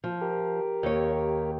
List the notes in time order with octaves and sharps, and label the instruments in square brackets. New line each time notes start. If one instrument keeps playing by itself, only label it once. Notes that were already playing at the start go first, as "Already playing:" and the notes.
[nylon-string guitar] F3
[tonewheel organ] G4 A#4
[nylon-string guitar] D#2 C#5